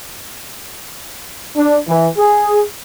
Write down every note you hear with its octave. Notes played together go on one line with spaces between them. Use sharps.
D4
E3
G#4